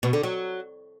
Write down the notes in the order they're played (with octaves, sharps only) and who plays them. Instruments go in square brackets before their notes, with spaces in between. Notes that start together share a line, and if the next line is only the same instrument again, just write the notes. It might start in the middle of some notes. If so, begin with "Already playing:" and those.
[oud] B2
D3
F#3